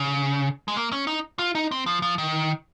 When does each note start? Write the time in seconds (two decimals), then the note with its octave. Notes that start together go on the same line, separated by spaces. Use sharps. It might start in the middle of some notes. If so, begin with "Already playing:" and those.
Already playing: C#3
0.68 G#3
0.77 A#3
0.92 C#4
1.07 D#4
1.39 F4
1.55 D#4
1.71 C4
1.86 F3
2.02 F3
2.18 D#3